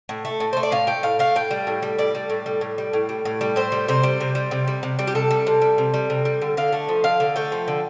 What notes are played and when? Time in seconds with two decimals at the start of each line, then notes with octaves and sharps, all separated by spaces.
0.09 A2
0.25 A3
0.40 A2
0.53 A3 C5
0.63 D5
0.72 A2 F5
0.87 A3 G5
1.03 A2 F5
1.19 A3 F5
1.35 A2 G5
1.51 G3
1.67 A2
1.82 G3
1.98 A2 D5
2.15 G3
2.30 A2
2.46 G3
2.61 A2
2.78 G3
2.93 A2
3.09 G3
3.25 A2
3.41 G3
3.56 A2 C5
3.72 G3
3.88 C3 C5
4.03 G3
4.20 C3
4.35 G3
4.51 C3
4.67 G3
4.83 C3
4.99 G3
5.07 G4
5.15 C3 A4
5.31 G3
5.47 C3
5.62 G3
5.78 C3
5.94 G3
6.10 C3
6.25 G3
6.41 D3
6.57 D3 F5
6.73 A3
6.89 F3
7.04 D3 F5
7.20 D3
7.36 A3 G5
7.52 F3
7.68 D3